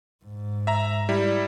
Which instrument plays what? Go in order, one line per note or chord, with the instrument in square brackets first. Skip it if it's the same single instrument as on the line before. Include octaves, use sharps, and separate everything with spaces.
[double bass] G#2
[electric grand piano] E5 A#5
G3 E4